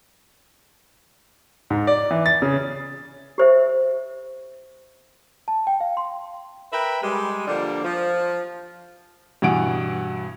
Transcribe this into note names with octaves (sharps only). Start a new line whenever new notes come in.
G#2
D5
E3
A6
C#3
G4 C5 E5
A5
G5
F5
C6
A#4 B4 E5 G5 B5
G3 G#3
D3 F3 G3 A#3 D4
F3
G2 B2 E3 B3 F#5 D7